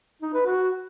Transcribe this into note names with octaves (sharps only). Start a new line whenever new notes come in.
D#4
B4
F#4